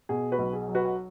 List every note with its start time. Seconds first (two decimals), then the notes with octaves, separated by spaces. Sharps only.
0.09 B2 G#4
0.32 F#4 B4
0.38 B1
0.53 G#4
0.68 F#3
0.75 F#4 B4
0.85 F#5